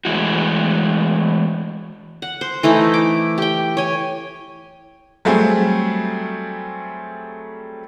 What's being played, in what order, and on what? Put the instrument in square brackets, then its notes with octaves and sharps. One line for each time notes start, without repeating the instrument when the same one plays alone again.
[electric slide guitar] E3 G#3 A3 E4 F#4
[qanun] F#5
C5
E3 A3 D#4 E4
D6
G4 G5
C#5 G#5
[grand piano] F#3 G3 A3 C4 G#4